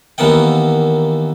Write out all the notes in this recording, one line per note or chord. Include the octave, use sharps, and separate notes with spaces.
D#2 E3 A#3 B3 F#5 G5